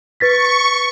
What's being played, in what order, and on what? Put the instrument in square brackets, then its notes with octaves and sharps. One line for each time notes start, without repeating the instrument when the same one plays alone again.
[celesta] B4 A6 B6 [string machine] C#6